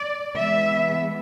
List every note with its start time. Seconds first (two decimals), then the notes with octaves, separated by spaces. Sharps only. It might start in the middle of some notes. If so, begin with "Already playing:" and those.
Already playing: D5
0.38 E3 G#3 B3 E5